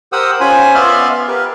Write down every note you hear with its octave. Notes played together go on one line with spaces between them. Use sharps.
G4 A#4 C5 F#5 D#6 E6
C#4 F4 C5 G#5 B5
B3 D5 E5 F5 C6 F6
G4 A#4 B4